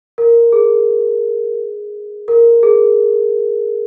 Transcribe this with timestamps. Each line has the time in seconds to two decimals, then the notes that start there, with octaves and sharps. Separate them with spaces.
0.18 A#4
0.53 G#4
2.28 A#4
2.63 G#4